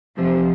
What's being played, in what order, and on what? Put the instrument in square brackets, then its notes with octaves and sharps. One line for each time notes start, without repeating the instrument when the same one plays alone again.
[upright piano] C3 [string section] F3